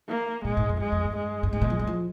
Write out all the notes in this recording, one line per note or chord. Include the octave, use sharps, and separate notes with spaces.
A#3
A#2 G#3
G#2
F2
G2 G#3
F2
G2
G#3
G2
G#2 G#3
A#2
F3
G3
F3